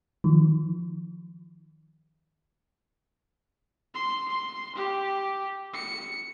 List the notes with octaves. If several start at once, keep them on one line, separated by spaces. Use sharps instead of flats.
D#3 F3
C6
C6
G4
C#7